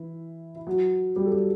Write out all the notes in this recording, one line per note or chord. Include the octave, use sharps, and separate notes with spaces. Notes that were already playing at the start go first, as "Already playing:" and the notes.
Already playing: E3 E4
E4
F#3 F#4
G3 G4
A4
G3 G4